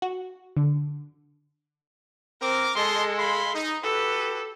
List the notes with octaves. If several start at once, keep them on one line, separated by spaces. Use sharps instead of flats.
F#4
D3
C4 A#4 D6
G#3 A4 D#5 A5 C6
F5 B5 C6
D#4
F#4 G4 A4 B4